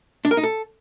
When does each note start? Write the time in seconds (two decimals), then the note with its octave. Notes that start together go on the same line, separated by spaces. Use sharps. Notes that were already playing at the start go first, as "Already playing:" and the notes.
0.25 D4
0.31 A#4
0.37 D#4
0.43 A4